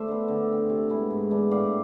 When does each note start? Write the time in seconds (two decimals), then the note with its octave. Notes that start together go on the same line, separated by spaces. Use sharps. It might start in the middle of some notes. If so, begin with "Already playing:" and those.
Already playing: A3 A4 C5 D5 E5
0.08 B3 D4
0.28 D3
0.49 A3 C4
0.69 C3
0.89 G#3 B3 E4
1.11 G#2
1.30 E3 B3 D4
1.51 A2 D5 F5